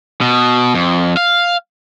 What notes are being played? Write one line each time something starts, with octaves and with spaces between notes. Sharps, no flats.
B2
F2
F5